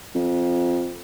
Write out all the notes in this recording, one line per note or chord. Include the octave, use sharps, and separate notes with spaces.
F2